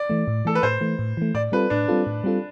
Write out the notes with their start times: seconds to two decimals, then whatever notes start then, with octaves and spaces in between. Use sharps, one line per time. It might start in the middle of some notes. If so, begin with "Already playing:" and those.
Already playing: D5
0.10 E3 A3
0.28 A2
0.45 E3 A3 A4
0.55 B4
0.63 A2 C5
0.81 E3 A3
0.99 A2
1.17 E3 A3
1.34 A2 D5
1.52 G3 C4 F4 A4 B4
1.70 A2 D4
1.88 G3 C4 F4 A4
2.07 A2
2.24 G3 C4 F4 A4